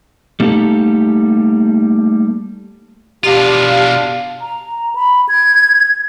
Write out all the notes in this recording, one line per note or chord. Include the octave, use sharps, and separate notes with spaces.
G3 A3 A#3 D#4 G4 A4
B2 D4 F4 G4 F5
A#5
B5
G#6